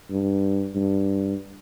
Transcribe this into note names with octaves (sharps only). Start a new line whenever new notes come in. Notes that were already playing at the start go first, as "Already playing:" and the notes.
G2
G2